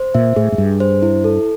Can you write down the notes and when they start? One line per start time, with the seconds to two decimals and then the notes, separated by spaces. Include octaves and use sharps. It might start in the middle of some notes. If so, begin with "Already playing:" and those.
Already playing: C5
0.14 A#2 E5
0.36 A2 G#4
0.52 G#2
0.58 G2 G#4
0.80 C5
1.02 E4
1.24 A4